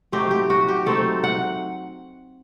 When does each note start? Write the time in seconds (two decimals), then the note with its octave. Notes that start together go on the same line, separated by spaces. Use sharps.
0.12 F#3 A3 C4 D#4 G4
0.31 G4
0.50 F#4
0.68 G4
0.86 F#3 A3 C4 D#4 A4
1.24 F#5